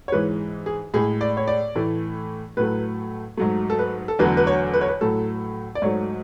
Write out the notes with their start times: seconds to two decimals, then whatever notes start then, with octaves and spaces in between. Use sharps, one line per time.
0.08 C#5
0.12 G#2 E3 G#3 B4
0.66 G#4
0.94 A2 G#3 G#4
1.21 D5
1.37 C#5
1.47 D5
1.76 A2 E3 A3
2.57 A2 F#3 A3 B4
3.37 G#2 F#3 A3
3.70 A4
3.79 B4
4.08 A4
4.19 E2 D3 F#3 A3 B4
4.37 B4
4.47 C#5
4.74 B4
4.81 C#5
4.88 B4
5.01 A2 F#3 A3 A4
5.75 D5
5.82 G#2 F#3 A3 C#5